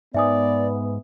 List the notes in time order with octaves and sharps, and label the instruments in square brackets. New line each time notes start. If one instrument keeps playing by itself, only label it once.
[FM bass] G#2 [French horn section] B3 [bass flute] D5 [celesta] E5 G#5 D#6